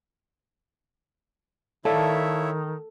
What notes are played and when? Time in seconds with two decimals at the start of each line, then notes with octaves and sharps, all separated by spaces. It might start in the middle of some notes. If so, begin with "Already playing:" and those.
1.85 D#3 E4 A4 C#5 D5 E5 F5 A5